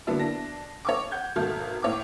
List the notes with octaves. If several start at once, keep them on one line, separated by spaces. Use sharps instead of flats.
D3 F#3 A#3 B3 D4 E4
D4 A#6
C#5 C#6 D6
F#5 G6 G#6
G#1 B2 A4 E5 F6
A2 C#5 E5 D6